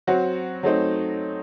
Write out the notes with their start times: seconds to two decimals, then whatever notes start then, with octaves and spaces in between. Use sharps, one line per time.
0.07 F#3 C4 F#4
0.63 F#3 A3 C4 D#4